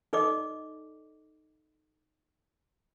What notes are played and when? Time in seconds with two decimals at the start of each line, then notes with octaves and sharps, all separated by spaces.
0.13 D#4 A4 D5 D#5 D6